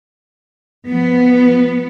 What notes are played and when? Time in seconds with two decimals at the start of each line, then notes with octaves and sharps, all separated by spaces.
0.88 F3 B3